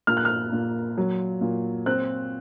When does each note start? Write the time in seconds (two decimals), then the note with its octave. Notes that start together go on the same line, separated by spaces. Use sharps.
0.07 A#2 F6
0.17 F#6
0.25 F6
0.52 A#2
0.98 F#3
1.41 A#2
1.86 C4 F#6